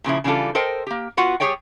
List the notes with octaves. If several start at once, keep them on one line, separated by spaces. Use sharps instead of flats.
A#2 C#3 F3 E4
C#3 E3 G3 D4 F4 A4
A4 A#4 C5 D#5 G5
A#3 G4
B3 F4 F#4 F#5
G3 G4 G#4 C#5 D5 G5